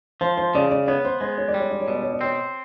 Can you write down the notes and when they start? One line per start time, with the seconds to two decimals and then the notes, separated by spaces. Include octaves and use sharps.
0.21 F3 C5
0.37 C5
0.55 C#3 D5
0.71 D5
0.88 B3 C#5
1.05 C5
1.21 G#3 C5
1.38 C#5
1.48 D5
1.54 G3 C#5
1.70 D5
1.80 C#5
1.88 B2 D5
2.02 C#5
2.13 D5
2.21 C4 C#5